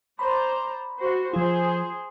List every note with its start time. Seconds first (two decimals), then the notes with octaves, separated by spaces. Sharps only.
0.19 C5 D5 A#5 B5
0.99 F#4 C5
1.34 F3 F4 G#4 C5